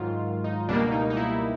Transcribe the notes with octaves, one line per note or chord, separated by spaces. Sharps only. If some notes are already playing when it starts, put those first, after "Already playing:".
Already playing: G#2 D#3 F#3 F4
D#4
C#2 B2 G3 A#3 D4
D#4
D#4
E4